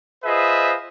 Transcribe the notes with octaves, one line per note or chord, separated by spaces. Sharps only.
F4 G#4 B4 C5 D#5 E5